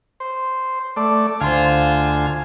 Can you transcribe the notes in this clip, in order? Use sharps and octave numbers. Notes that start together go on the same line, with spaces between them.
C5
A3 D5
D2 F4 C5 F5 G#5